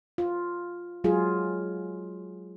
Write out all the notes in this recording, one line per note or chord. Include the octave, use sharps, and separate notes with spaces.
F4
F#3 G#3 F4 G#4